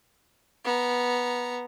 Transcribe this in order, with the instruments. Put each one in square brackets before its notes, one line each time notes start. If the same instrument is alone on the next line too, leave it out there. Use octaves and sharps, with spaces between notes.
[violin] B3 A#5